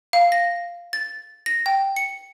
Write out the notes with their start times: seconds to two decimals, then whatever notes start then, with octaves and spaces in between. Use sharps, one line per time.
0.13 F5
0.32 A#6
0.93 A6
1.46 A#6
1.66 G5
1.96 C#7